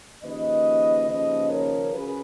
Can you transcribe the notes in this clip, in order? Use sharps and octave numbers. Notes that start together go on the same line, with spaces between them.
D#2 C#3 F3 B4 D#5
D#2 C#3 F3 B4 D#5
A#4 C#5
C#3 F#3 G#4 B4